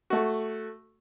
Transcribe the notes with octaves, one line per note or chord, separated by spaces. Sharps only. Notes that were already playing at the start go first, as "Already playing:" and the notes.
A3 F#4